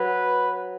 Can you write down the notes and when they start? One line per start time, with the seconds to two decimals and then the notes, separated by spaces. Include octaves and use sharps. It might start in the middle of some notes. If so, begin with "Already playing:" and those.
Already playing: F#3 B4